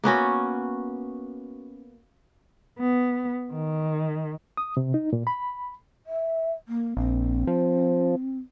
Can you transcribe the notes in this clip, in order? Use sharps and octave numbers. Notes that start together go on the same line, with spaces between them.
A#3 B3 C#4 F#4
B3
D#3
D#6
C3
D#4
A#2
B5
E5
A#3
A#1 C4
F3